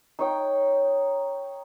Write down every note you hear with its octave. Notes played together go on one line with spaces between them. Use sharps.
D#4 C#5 G5